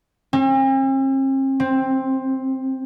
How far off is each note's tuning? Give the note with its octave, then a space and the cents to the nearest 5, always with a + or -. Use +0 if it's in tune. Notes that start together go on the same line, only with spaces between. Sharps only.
C4 +45
C4 +10